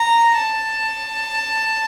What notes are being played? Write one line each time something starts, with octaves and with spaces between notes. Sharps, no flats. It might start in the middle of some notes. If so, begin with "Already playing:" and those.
Already playing: A#5
A5